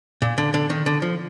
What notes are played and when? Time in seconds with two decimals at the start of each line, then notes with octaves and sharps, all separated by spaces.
0.22 A#2
0.38 D3
0.54 D3
0.70 D#3
0.86 D3
1.02 F3